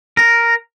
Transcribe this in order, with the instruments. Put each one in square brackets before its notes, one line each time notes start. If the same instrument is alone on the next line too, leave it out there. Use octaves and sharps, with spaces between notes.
[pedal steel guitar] A#4